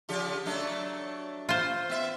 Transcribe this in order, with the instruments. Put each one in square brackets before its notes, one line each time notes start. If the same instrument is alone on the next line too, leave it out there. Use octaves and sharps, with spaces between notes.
[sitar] C#3 F3 G4
F#3 A3 D4
[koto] F4 C5
[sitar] B3 E5